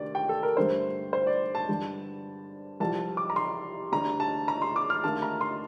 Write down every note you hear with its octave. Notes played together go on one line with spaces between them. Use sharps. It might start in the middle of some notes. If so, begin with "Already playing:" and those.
Already playing: D2 C3 D#3 D5
G5
A4
A#4
G2 D3 A3 C5
C5
D5
A5
G2 D3 G3
C2 C3 F3 A5
D6
A#5
C6
D2 D3 G3 A#5
A5
A#5
C6
D6
F6
D#2 D3 A3 A5
A#5
C6